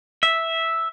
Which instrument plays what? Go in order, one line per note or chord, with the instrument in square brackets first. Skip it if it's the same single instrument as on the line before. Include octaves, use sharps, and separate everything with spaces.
[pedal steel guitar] E5